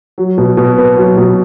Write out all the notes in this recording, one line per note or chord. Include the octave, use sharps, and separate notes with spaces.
F#3
B2
B2
B3
F#3
B2